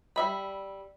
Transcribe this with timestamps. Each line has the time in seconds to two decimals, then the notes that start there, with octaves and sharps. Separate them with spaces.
0.16 G3 E5 B5